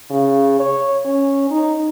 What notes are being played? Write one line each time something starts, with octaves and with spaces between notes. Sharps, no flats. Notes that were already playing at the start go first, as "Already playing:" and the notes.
C#3
C#5
C#4
D#4